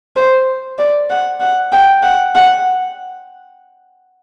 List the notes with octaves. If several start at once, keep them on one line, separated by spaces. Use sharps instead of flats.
C5
D5
F#5
F#5
G5
F#5
F#5